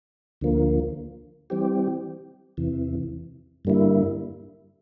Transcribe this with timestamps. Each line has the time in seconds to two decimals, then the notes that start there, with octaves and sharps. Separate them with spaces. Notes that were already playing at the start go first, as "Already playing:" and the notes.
0.41 D2 D3 F3 A#3
1.50 E3 G3 C4 G4
2.57 E2 C3 E3
3.65 G2 D3 G3 A#3 E4